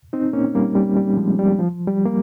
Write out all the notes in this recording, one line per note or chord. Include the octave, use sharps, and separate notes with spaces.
C4 D#4
A#3 C#4
G3 A#3
G3
G3
F3 G#3
G3
F3
G3
A#3